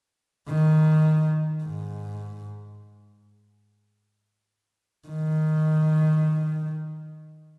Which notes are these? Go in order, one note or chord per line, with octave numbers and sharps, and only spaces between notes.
D#3
G#2
D#3